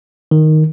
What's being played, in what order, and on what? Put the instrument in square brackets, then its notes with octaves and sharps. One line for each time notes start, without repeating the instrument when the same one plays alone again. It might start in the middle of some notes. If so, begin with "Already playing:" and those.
[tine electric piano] D#3